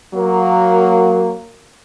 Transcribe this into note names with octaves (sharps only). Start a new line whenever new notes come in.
F#3 A#3